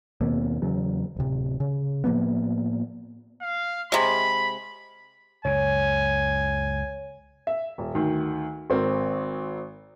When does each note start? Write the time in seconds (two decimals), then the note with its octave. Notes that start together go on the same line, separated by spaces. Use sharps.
0.21 D#2 B2 A#3 C4
0.62 E2 C#3 F#3
1.17 D1 C3
1.60 C#3
2.04 A2 F3 A#3 B3
3.41 F5
3.92 C3 G#3 B5
5.45 C#2 F#2 C#3 C#5 G#5
7.47 E5
7.78 D#1
7.95 D2 D#3
8.70 G#1 C4 A#4